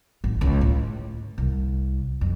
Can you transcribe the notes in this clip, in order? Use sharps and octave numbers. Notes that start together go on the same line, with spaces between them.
A1
C#2
A2
C2
F2